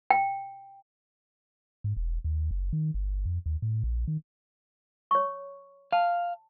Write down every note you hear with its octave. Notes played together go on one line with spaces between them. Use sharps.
G5
G#2
E1
D#2
F#1
D#3
G1
F2
D#2
A2
A#1
D#3
C#5 C#6
F5 A5